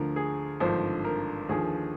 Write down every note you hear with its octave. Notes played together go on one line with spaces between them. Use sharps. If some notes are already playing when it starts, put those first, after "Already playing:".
Already playing: D2 D3 F3 A#4
G#4
G#1 G2 D3 F3 C5
A#4
D#2 D3 F3 G#4